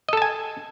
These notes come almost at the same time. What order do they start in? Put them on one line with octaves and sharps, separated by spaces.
D#5 A4 A5 G#5